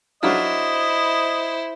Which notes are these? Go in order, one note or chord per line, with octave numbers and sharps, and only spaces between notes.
F#3 D4 E4 F4 C5 D#5